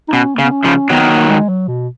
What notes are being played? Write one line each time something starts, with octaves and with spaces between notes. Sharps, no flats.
D#4
B2 C#4
A#3
C#3
B3
C#4
C#3 F3
D#3 F#3 B3
B3
A#3
G#3
F#3
B2